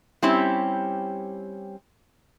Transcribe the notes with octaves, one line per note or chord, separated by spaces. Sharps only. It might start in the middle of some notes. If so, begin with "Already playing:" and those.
G3 C4 C#4 E4 G4